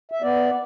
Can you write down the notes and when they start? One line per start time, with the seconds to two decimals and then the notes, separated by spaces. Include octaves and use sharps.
0.12 E5
0.22 B3 D5